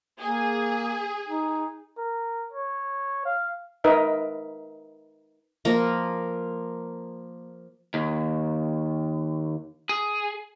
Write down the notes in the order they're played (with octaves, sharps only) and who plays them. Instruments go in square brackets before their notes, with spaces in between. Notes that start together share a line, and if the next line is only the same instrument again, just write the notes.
[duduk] A#3 [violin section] G#4
[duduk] D#4
[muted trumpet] A#4
C#5
F5
[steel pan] D#4 A#4 B4 D#5 E5
[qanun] F3 A#3 A#4
[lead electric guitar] D#2
G#4